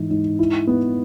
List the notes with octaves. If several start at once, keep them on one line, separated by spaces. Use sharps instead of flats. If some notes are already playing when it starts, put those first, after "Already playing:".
Already playing: G#2 E3
G#2
E4
B3